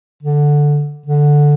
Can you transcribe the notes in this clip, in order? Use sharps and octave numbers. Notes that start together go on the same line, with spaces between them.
D3
D3